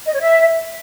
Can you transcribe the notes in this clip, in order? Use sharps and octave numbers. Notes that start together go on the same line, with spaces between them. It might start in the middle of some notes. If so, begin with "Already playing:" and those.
D#5
C#5
E5